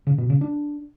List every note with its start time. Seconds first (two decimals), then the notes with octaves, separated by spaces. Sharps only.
0.07 C#3
0.18 B2
0.30 C#3
0.41 D4